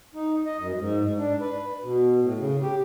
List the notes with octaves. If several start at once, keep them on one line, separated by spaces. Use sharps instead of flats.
D#4
D#5
F#2
G#2
G#2
D4
B4
B2
A2
C#3
G4